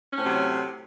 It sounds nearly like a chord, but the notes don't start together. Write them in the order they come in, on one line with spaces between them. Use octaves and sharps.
C#4 A2 C4 C3 F#3